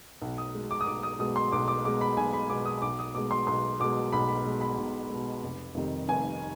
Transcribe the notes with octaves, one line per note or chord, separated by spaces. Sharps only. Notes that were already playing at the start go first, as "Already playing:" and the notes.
B1
D#6
B2 G#3
D6
D#6
B1 D6
D#6
B2 G#3 D#6
C6
B1 D6
D6
B2 G#3 D6
B5
B1 G#5
B5
B2 G#3 D6
D#6
B1 D6
D#6
B2 G#3 D6
C6
B1 C6
B2 G#3 D6
B1 B5
B5
B2 G#3
B5
B1
B2 G#3
F1
F2 C3 D#3 G3
F1 G#5